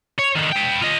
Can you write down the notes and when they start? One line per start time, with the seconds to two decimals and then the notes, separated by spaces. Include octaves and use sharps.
0.19 C#5
0.36 D3 D#3
0.52 B4 G5
0.82 F4 D#5